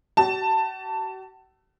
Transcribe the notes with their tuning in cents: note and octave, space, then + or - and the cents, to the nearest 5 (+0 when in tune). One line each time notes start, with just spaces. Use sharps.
F#4 +45 A5 +15